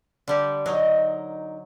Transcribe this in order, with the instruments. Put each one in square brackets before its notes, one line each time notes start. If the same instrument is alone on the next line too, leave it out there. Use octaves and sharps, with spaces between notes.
[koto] D3 G3 G4
[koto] F#3 [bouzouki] D#4 A#4 D#5